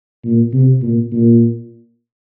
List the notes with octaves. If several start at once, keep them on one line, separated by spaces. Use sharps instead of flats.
A#2
C3
A#2
A#2